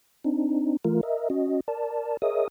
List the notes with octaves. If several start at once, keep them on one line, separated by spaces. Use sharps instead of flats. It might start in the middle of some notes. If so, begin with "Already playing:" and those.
C4 D4 D#4
E3 A3 F4 A#4
A#4 D#5 E5
C#4 F#4 D#5
A#4 D5 A5
G#4 A#4 C#5 D#5 E5 D#6